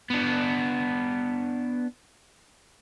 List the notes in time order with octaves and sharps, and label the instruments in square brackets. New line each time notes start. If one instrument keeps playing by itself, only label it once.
[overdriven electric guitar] B3 D4